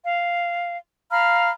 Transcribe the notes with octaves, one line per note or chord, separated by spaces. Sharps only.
F5
F5 A#5 B5 F6